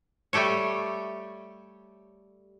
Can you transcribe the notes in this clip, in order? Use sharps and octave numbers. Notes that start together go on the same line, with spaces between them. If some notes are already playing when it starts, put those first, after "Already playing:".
G3 A3 G4 A4 C#5